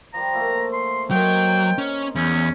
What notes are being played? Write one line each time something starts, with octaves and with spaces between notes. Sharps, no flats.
F3 G3 A#5
F3 A3 A#3
C6
F#3 A#3 D#4 C5 G5
C#4
E2 C#4